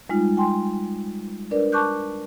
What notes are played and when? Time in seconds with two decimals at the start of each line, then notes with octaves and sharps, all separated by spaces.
0.10 G3 G#3 D#4 F4
0.37 G5 G#5 C6
1.51 D4 A#4 B4 D5
1.72 A5 C#6 D6 F#6 G6